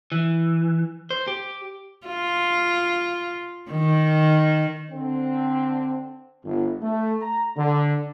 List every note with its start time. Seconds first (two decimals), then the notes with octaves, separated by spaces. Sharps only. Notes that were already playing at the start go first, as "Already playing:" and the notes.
0.12 E3
1.11 C5
1.28 G4
2.07 F4
3.70 D#3
4.91 D3 C4
6.44 G1
6.82 A3
7.22 A#5
7.57 D3